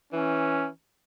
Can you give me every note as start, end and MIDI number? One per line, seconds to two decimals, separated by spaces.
0.13 0.68 52
0.13 0.68 61